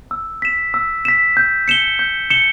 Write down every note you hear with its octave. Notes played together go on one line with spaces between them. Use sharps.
E6
B6 E7
E6
B6 E7
G6
C#7 E7 G7
G6
C#7 E7 G7